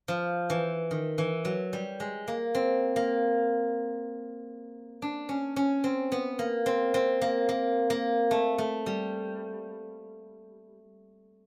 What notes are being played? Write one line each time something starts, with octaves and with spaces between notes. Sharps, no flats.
F3
E3
D#3
E3
F#3
G3
G#3
A#3
C4
A#3
D4
C#4
C#4
C4
B3
A#3
C4
C4
A#3
A#3
A#3
A3
A3
G3